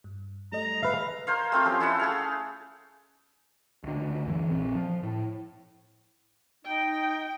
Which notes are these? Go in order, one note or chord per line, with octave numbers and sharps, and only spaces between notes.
G2
G3 A3 D#5 A#5
B4 E5 F5
A#4 C5 C#5 F5
A3 C4 F4
F3 C#4 G4
E4 A4 E5 F#5
A3 G#4 F5
C#2 D3
F#2 E3
A#1 C4
F3
A2
D#4 G5